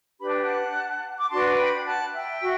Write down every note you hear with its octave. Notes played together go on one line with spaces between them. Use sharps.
D4 G4 B4 B5
A5
G5
F#5 A5
D6
D4 F#4 B4 A5 C6
G5 B5
F#5 A5
E5 G5
F#4